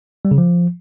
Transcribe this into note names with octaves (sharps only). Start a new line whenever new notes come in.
G3
C#3
F3